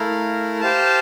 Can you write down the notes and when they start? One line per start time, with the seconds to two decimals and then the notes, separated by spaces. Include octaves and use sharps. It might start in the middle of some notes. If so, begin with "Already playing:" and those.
Already playing: A3 E4 A#4 F5
0.61 G4 C5 F5 A5